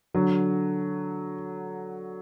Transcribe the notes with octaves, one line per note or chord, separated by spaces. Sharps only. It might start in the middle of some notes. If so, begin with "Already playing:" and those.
D3 F#3